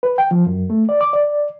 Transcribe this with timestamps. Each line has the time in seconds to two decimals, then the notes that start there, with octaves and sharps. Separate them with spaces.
0.03 B4
0.18 G5
0.31 F3
0.46 F#2
0.70 A3
0.89 D5
1.01 D6
1.13 D5